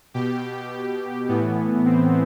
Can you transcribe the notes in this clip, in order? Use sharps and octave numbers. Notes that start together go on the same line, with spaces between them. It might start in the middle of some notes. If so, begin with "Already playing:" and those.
B2 G4
A2 E3 B3
C4